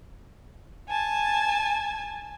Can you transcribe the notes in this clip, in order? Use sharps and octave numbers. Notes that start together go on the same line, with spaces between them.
G#5 A5